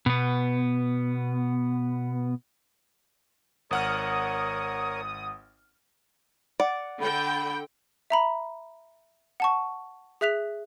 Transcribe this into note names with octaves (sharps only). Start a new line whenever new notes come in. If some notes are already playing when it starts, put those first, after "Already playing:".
B2 B3
G#1 A#4 C#5 F#5 D#6 F6
D5 F#5
D3 G5 B5
E5 A#5 B5
F#5 A5 C#6
G#4 E5 F#6 B6 F7